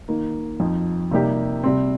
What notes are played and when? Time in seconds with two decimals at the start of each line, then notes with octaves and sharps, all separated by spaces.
0.08 D#3 A#3 D#4
0.60 F2 F3 D#4
1.11 C3 G3 A#3 D#4 G4
1.64 C3 G3 C4